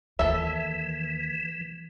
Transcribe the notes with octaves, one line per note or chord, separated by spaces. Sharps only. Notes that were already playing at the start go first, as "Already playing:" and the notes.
D#2 E3 A4 E5